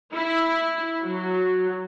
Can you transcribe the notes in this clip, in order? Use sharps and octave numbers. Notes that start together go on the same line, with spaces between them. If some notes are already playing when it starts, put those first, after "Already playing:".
E4
F#3